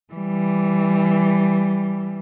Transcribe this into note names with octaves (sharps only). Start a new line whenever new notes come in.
E3 G3